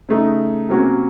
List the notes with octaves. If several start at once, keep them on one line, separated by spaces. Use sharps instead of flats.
C#3 A3 D#4
C3 F#3 A#3 C#4 F#4